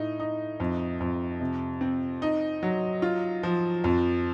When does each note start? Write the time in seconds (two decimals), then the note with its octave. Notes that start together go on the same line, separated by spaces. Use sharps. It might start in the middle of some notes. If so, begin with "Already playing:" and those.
Already playing: A2 D#4
0.20 D#4
0.60 F2
1.00 F2
1.41 C3
1.81 C4
2.22 D#4
2.63 F#3
3.02 F4
3.43 F3
3.84 F2